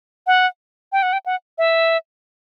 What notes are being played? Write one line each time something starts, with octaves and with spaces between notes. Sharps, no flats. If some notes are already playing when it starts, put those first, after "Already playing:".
F#5
G5
F#5
G5
F#5
E5